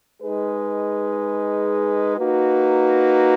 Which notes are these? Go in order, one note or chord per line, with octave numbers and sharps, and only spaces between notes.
G#3 D#4 G#4 B4
A#3 D#4 F#4 B4